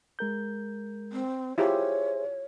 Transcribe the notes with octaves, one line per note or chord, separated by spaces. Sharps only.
G#3 A#4 G6
C4
E4 F4 G4 G#4 C5 C#5 E5